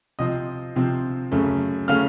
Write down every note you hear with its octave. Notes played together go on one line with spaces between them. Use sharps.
C3 F3 C4 D#5 D#6
C3 F3 C4
F#2 C#3 A3 C#4
C#3 A3 C#4 F5 F6